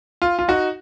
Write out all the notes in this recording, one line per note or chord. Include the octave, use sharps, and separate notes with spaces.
F4
F4
D#4 F#4